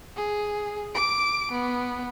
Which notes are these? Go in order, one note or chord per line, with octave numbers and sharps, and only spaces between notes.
G#4
D6 D7
B3